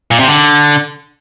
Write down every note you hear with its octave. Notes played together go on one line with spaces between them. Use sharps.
A#2
C3
D3